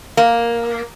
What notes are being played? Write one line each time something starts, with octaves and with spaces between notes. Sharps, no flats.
A#3